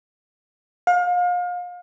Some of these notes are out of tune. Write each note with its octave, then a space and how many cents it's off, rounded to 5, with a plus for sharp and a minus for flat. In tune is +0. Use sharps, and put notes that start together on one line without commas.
F5 +35